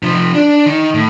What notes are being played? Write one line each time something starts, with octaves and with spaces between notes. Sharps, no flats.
C3 F3
D4
D#3
A2